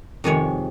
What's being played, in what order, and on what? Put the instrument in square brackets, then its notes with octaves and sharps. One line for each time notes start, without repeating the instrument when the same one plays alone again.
[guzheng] F2 C3 D#3 G#3 C#5